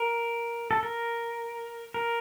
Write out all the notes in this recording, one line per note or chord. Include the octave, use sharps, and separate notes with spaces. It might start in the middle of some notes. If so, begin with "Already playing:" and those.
Already playing: A#4
A4
A#4
A#4